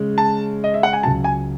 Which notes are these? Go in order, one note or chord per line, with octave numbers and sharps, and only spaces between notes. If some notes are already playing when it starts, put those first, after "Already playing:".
Already playing: C#3 G#3 C#4
A5
D#5
E5
F#5
G#5
C#2 C#3 F#3 A5
G#5